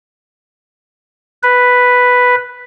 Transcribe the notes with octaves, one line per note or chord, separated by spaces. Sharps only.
B4